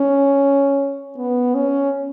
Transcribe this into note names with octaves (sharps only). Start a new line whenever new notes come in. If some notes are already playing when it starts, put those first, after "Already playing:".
Already playing: C#4
B3
C#4